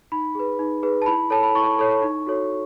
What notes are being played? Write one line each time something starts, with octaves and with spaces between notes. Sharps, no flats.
D#4 B5
G#4 B4
D#4
G#4 B4
A5
E4 B5
A4 C#5 A5
B5
E4 C#6
A4 C#5
D#4
F#4 A4 C#5